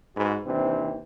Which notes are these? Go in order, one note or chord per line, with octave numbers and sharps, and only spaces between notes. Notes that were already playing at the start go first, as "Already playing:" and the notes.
G#2 F#4 G#4 B4
D#2 C3 E3 C4 D4